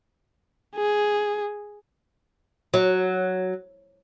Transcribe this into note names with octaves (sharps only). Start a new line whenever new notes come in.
G#4
F#3